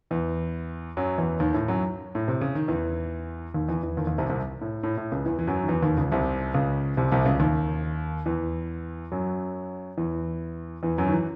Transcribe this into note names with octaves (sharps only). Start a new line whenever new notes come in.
E2 E3
F#2 F#3
E2 E3
D#2 D#3
A2
F#2 F#3
A2
C3
C#3
D#3
E2 E3
D#2 D#3
E2 E3
E2 E3
D#2 D#3
D#2 D#3
C2 C3
C2 C3
A2
A2
A2
C#2 C#3
E2 E3
E3
F#2 F#3
D#3
E2 E3
D#2 D#3
C#2 C#3
C2 C3
C#2 C#3
C2 C3
C2 C3
C#2 C#3
D#2 D#3
E2 E3
F#2 F#3
E2 E3
E2 E3
F#2 F#3
D#3
E3